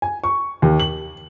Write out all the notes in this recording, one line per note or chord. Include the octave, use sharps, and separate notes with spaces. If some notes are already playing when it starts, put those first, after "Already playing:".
G#5
C#6
D#2
F#7